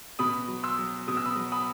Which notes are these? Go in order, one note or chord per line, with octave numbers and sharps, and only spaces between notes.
B2 B5 D#6
F#3
C6 E6
F#3
B2 D#6
E6
B5 D#6
F#3
B5 D#6